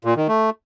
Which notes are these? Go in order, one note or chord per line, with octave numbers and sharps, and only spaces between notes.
A#2
D#3
A3